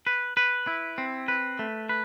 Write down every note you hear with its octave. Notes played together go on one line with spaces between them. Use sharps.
B4
B4
E4
C4
B4
A3
B4